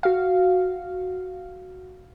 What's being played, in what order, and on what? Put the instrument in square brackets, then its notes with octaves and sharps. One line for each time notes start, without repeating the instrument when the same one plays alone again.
[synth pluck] F#4 F5